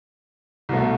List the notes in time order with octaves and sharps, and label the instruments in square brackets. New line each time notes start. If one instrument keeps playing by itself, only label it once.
[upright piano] C2 B2 A3